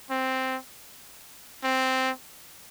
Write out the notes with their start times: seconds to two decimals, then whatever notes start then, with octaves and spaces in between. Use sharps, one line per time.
0.11 C4
1.64 C4